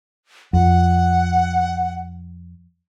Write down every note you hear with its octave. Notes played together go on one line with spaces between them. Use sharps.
F2 F#5